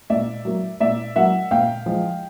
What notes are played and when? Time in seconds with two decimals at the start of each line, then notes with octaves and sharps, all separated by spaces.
0.10 A#2 D5 E5
0.45 F#3 A#3
0.80 A#2 D5 E5
1.16 F#3 A#3 E5 F#5
1.51 A#2 F5 G5
1.86 F3 G#3